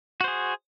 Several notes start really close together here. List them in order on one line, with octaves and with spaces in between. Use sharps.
F#4 C5 G#4